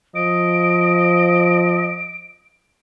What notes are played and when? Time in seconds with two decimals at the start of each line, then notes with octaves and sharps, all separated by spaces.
0.15 F3 D#5 D7